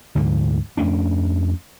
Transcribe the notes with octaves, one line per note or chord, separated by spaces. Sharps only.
D2 G#2 D3 F3
F2 A3 C#4 D4